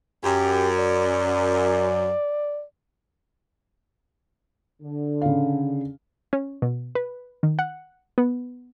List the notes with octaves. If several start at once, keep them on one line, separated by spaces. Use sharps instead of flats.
F#2 G4
D5
D3
C#3 F5
C#4
B2
B4
D#3
F#5
B3